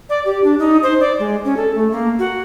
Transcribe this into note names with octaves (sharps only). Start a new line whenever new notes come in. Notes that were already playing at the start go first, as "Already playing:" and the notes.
D5
G4
D4
D#4
C5
D5
G#3
C#4
A4
A3
A#3
F#4